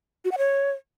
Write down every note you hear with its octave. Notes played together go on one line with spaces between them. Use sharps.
F#4
F#5
C#5